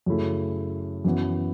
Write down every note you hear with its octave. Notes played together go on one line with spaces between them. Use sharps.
F#2 C#3 A3 E4
F#2 E3 B3